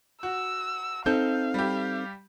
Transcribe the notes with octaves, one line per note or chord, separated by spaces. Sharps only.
F#4 E6
C4 D#4 A4 F5 G6
G3 G4